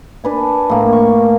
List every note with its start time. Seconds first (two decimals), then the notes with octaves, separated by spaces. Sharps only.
0.24 D4 B4 G#5
0.69 A2 A#3
0.93 C#6